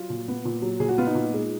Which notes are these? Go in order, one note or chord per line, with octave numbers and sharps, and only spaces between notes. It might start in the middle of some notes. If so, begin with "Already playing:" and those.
Already playing: F#3 F4
A#2
B3
A#2
F#3
A#2 G#4
F#4
B3 F4
D#4
A#2
G#3